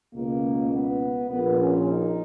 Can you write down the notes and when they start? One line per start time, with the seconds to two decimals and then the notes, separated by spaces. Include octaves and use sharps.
0.14 C#2 B2 A#3
0.72 B3
1.29 A#1 A#2 B3
1.59 C#4
1.88 D#4